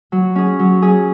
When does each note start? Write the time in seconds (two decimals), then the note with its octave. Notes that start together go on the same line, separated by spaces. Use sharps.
0.12 F#3
0.35 C#4 G#4
0.59 F#3
0.82 C#4 G#4